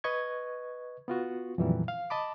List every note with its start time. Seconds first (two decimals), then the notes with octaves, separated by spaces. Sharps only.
0.04 B4 D#5 C#6 G#6
1.08 B3 F4 F#4
1.58 F2 A#2 D#3 E3 F#3 G3
1.88 F5
2.10 D#5 A5 B5 D6